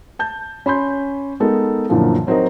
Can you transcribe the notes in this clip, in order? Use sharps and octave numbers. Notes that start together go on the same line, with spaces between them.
A5 G6
C#4 B5 C6 G6
G#3 B3 D#4 A4 A#4
F#2 A#2 D3 E3 F3
F#3 C4 D#4 A#4 D#5